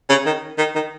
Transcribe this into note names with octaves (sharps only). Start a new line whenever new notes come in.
C#3
D#3
D#3
D#3